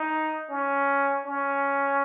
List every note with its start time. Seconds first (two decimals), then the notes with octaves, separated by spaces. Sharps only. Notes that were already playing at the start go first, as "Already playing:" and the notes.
Already playing: D#4
0.50 C#4
1.25 C#4